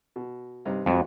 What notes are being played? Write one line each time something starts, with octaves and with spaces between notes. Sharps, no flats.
B2
G2 C3 D#4
F2 G#3 F#4